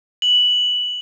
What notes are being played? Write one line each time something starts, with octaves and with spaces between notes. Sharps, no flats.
F#7